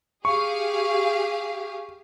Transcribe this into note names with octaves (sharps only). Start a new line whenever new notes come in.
G4 G#4 F5 C#6